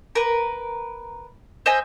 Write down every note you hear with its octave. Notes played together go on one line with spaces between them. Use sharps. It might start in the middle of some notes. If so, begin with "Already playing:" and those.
A#4 B4
C5 D#5 E5 G#5